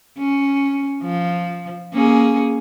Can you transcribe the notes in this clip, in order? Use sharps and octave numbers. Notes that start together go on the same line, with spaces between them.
C#4
F3
A#3 C#4 G#4